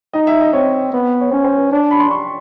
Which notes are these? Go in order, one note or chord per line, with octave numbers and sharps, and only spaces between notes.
D#4 D#5
E5
D#5
C4 C#5
B3
C#5
C#4 C5
C5
B4
D4 C#5
B5
C6
C#6